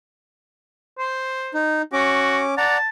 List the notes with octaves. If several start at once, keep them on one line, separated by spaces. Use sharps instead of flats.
C5
D#4
C#4 F#4 D6
D5 F#5 A5 A#5